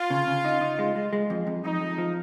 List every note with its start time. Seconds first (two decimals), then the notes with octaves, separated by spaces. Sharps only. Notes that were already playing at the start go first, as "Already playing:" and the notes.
Already playing: F4
0.10 C#3
0.27 C#3
0.45 D#4
0.61 D#4
0.79 G#3
0.96 G#3
1.13 G#3
1.30 F2
1.47 F2
1.64 F2 D#4
1.81 F2
1.98 F3